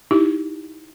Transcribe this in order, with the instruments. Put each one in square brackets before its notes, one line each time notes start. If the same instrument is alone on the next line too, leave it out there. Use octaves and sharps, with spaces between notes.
[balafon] D#4 E4 G4